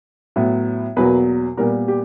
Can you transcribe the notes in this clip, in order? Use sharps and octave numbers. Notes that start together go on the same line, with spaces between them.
A2 F#3 B3
E2 B2 F#3 A#3 B4
A#2 G3 B3 A#4
G4